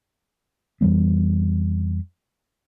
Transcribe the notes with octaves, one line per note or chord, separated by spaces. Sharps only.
F2 E3 G3 B3